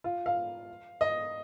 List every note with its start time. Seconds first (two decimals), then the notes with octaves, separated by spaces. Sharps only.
0.04 F4
0.26 F5
1.01 D#5